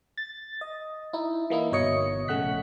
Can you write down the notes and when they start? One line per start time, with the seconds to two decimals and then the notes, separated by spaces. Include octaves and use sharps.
0.17 A6
0.61 D#5
1.13 D#4 E4
1.50 E3 A#3 D#4 E4
1.72 G1 B2 C#5 D#5 C#7
2.28 A#1 C#3 A3 F#5 F#6 B6